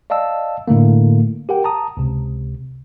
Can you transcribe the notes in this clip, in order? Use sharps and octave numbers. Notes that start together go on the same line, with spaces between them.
D5 D#5 F5 A5 E6
A2 D3 A3 A#3
G4 A#4 F#5 G5
A5 A#5 D#6
C#2 C3